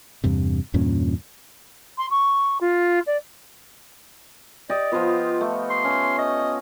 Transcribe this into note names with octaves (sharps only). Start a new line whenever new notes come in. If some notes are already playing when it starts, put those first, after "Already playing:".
E2 G2 C3
E2 G2 A#2 C#4
C6
C#6
F4
D5
G4 D5 D#5
F3 B3 F4
A3
C6
C#4
D#5